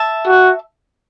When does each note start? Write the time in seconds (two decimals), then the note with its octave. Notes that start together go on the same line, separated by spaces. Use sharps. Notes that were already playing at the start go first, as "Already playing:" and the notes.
Already playing: E5 A5
0.26 F#4